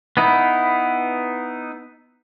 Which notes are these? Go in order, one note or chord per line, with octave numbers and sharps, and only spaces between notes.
B3 D#4 E4